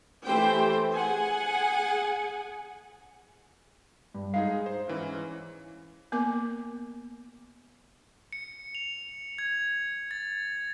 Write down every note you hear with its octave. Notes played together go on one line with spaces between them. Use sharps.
E3 A3 G4 C5 G5
G#4 F#5 G#5
G2
G#3 D#4 G#4 F5
C5
G#2 E3 C#4
A#3 B3 A#4 D6
C#7
F7
G#6
A6